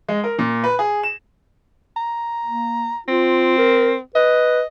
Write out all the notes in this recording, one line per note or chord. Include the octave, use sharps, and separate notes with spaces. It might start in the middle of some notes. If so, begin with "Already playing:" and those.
G#3
A#4
A#2
B4
G#4
E7
A#5
A#3
C4 F4
A#4
B4 D#5